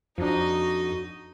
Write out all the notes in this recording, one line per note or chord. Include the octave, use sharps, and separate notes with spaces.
F2 F3 D4 D#4 F#4 D#5